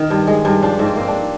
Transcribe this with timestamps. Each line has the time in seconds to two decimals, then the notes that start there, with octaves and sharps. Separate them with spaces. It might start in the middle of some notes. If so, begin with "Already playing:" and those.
Already playing: D#3
0.10 G2
0.27 G#3
0.45 G2
0.62 F3 D4
0.79 G#2
0.85 C4
0.96 A#3 C4
1.08 D4